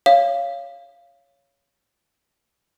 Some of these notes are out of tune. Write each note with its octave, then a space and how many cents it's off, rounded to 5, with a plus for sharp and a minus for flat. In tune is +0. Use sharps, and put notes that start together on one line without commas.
C#5 +10 F5 -15